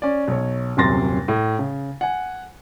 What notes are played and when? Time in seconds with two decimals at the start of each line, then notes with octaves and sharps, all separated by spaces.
0.02 C#4 D5
0.28 B1 C#5
0.77 D#1 F#2 C3 C6 A6 A#6
1.28 A2
1.59 C#3
2.01 F#5 G#5